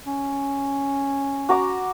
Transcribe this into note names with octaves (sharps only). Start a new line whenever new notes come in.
C#4
F#4 A#5 D6